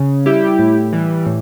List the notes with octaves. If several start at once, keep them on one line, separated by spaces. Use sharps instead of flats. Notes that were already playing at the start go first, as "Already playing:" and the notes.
Already playing: C#3
G3 E4 G4
A2
E3 G3
A2